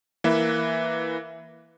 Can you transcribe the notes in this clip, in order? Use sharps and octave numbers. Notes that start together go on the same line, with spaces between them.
E3 A#3 B4 E5